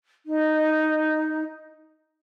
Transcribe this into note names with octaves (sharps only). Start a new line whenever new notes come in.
D#4